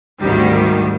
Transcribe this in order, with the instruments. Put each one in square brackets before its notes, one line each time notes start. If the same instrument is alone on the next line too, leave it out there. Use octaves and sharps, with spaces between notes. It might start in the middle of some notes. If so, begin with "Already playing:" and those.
[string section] G#1 D2 D#3 G3